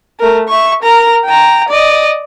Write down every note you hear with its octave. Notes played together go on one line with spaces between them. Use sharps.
A3 A#4
E5 C#6
A#4 A#5
G5 A#5
D5 D#5